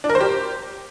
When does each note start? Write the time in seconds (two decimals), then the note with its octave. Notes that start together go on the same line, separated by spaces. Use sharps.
0.04 D4
0.09 A#4
0.15 C5
0.20 G4